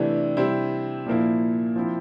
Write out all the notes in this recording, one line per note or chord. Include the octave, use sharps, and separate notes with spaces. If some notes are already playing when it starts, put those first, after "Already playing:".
Already playing: C3 E3 A3 D4
C3 G3 C4 E4
A#2 F3 A#3 E4
F3 C4 E4